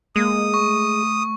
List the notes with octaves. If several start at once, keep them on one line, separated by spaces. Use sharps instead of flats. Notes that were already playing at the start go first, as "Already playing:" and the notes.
G#3 A#3 D#6
A3 C#6